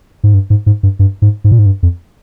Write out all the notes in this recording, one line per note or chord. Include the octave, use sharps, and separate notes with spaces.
G#2
G2
G#2
G#2
G2
G2
G#2
G#2
A#2
G#2
G2
F2